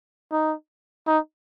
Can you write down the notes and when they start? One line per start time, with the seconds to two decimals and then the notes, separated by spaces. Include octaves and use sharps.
0.32 D#4
1.07 D#4